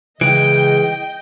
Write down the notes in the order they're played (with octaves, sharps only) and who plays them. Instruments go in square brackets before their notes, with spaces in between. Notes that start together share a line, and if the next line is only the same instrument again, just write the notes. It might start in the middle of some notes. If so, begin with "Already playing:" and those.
[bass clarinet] C#3 [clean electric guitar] E3 G#3 [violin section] D#5 G5 [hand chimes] D7